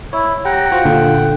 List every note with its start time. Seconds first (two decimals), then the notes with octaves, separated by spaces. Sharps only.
0.13 E4 C#5
0.45 G4 F#5 G5 A#5
0.72 F4 F#4 C5
0.85 A#2 D3